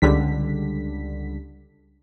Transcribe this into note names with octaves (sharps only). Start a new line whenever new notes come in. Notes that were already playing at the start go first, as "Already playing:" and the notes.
C#2 D3 G3 B6